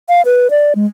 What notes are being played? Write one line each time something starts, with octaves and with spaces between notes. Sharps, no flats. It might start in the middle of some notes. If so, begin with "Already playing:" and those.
F5
B4
D5
G#3